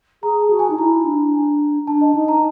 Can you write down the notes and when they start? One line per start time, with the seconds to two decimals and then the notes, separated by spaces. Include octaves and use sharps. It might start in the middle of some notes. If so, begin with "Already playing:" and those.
0.23 G#4 A#5
0.42 A5
0.50 F#4
0.59 G#5
0.70 D#4
0.78 E4 A#5
1.05 D4
1.87 D4 A5
2.01 D#5
2.15 D#4
2.28 A#5